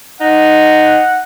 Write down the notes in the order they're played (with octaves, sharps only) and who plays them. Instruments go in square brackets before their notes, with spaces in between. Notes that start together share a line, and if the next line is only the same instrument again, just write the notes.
[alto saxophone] D#4 [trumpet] F#5